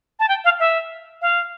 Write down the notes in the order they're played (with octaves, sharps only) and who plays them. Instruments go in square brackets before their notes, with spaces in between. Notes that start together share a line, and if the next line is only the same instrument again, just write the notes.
[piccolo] A5
G5
F5
E5
F5